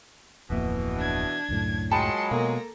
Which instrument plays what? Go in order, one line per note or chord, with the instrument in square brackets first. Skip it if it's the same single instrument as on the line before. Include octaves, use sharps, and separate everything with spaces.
[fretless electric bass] D1 F2 A#3 [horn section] B2 E3
[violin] D4 G#6
[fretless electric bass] C#2 F#2 A2
[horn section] A#2 F#3 G#3 [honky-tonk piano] G5 A5 B5 [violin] C6 C#7
[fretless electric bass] B2 [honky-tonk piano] A#3 [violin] A4 A#5